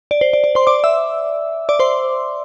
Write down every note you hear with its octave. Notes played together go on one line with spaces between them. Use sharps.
D5
C5
D5
D5
C5 C6
D5 D6
E5 E6
D5 D6
C5 C6